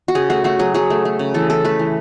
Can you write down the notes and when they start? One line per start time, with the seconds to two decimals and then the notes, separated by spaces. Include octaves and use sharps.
0.08 F#4
0.15 C#3 G#4
0.30 A3 F#4
0.44 A3 F#4
0.59 F#3 G#4
0.74 F#3 G#4
0.90 A3
1.05 A3
1.19 C#3
1.34 E3 A4
1.50 E3 A4
1.64 A3 B4
1.79 E3